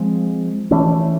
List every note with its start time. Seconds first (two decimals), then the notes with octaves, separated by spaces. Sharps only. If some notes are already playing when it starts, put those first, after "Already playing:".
Already playing: F3 G#3 C4
0.71 E3 A3 C#4